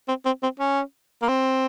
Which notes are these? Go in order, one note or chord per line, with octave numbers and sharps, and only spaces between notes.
C4
C4
C4
C#4
A#3
C4